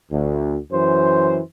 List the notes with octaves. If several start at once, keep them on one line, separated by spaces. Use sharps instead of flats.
D2
F#2 E3 C5